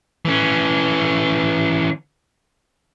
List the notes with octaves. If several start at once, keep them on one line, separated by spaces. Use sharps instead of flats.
E3 C#4